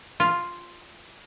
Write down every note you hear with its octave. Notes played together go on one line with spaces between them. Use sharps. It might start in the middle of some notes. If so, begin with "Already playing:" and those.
F4